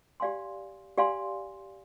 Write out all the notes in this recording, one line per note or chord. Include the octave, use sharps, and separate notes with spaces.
G4 D5 F5 G#5 C6
G4 D5 F5 G#5 C6